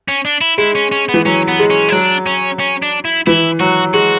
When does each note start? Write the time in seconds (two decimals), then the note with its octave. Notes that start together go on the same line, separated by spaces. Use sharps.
0.08 C#4
0.25 D4
0.41 E4
0.58 G#3 E4
0.75 C#4
0.92 C#4
1.09 B3
1.14 E3
1.25 F#3 C#4
1.48 B3
1.59 G#3
1.70 C#4
1.89 E4
1.92 F#3 D4
2.26 C#4
2.59 C#4
2.82 D4
3.05 E4
3.27 E3 E4
3.60 F#3 F#4
3.94 G#3 F#4